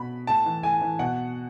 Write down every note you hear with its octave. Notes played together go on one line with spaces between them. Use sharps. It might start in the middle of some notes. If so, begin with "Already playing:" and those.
Already playing: B2 B5
A2 A5
E3
A2 G#5
E3
B2 F#5